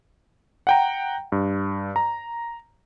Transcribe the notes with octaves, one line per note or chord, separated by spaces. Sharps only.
F#5 G5 A#5
G2
A#5